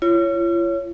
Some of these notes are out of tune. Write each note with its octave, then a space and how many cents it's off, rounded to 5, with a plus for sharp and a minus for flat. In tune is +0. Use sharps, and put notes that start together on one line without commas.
F4 -45 C#5 +5